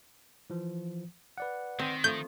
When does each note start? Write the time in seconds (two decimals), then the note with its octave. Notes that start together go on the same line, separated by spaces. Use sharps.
0.50 E3 F3
1.38 B4 D5 F#5
1.79 D#3 C4
2.04 F3 A3 G6